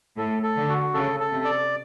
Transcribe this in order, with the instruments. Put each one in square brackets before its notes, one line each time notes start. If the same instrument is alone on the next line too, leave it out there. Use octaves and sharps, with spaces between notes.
[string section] A2 [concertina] A4
[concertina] A4
[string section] D3
[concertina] F#4
[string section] C#3 [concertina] A4
[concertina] A4
[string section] C3
[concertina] D5